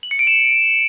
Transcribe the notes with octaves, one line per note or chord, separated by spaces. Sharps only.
F#7
C#7
D7
E7